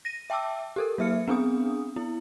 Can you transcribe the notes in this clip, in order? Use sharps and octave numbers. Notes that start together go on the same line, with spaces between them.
A#6 D#7
E5 G5 A5 D6 E6
G4 A4 A#4
F#3 A#3 E5 F6 C#7
B3 C4 D4 G#4 D#6
B3 E4